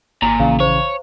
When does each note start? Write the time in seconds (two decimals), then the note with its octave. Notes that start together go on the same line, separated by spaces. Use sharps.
0.22 G#1 A#2 A#5
0.40 A#1 C#3 E3 F5
0.60 C5 C#5